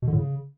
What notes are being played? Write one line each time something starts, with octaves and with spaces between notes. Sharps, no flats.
B2
D3
A2
C#3